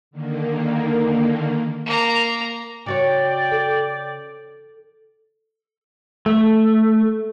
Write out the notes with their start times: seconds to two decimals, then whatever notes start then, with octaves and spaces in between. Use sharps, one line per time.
0.11 D3 D#3 A#3
1.86 A#3 A#5
2.86 C#3 F#4 C#5 D5 G5
3.51 A4
6.26 A3